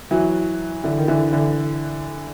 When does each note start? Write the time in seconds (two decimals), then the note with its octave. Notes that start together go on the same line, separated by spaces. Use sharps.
0.11 E3 F#3
0.84 D3 E3
0.98 D#3
1.08 D3 E3
1.33 D3 E3